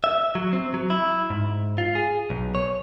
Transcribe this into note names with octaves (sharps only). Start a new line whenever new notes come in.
E5
F#3
C4
F#3
E4
G#2
F4
G#4
B1
C#5